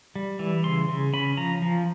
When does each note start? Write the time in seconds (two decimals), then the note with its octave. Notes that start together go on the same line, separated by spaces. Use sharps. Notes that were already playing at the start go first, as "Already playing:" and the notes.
0.16 G3
0.39 E3
0.64 C#3 C6
0.89 C#3
1.14 C#4 B5
1.37 F3 A#5
1.62 F3